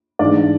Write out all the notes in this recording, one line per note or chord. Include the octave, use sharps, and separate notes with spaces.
G#2 E3 G#3 D4 D5